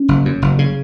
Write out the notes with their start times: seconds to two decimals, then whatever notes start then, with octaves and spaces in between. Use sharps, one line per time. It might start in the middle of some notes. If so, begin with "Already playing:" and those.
Already playing: C#4
0.08 F#1
0.25 F#2
0.42 F#1
0.59 C#3